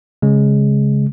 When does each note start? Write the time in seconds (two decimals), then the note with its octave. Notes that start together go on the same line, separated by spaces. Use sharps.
0.22 C#3 G#3